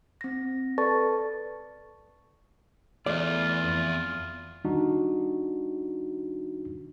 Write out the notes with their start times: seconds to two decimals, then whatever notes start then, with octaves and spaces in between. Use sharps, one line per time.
0.21 C4 A#6
0.78 A4 B4 D5 A5 C#6 A6
3.06 E2 A3 F4 D5
3.64 F2
4.65 D#3 G3 D4 D#4 F#4